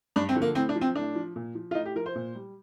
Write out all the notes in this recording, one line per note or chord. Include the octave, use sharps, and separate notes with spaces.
G2 D4
C4
D3 F3
A#3
A2 C4
D4
F3
C4
A2 D4
F3
A#2
F3
F4
A2 D#4
G4
F3 A#4
C5
A#2
G3